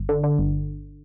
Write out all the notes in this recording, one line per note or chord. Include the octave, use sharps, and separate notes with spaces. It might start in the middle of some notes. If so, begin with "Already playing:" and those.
Already playing: G1
D3
D3
G1